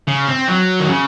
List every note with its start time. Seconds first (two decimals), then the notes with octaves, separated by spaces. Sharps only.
0.08 C#3
0.28 C4
0.48 F#3
0.80 D#3
0.89 C#3